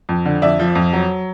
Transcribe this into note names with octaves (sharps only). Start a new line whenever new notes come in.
F2
D3
F2 D5 E5
F3
F2
F#3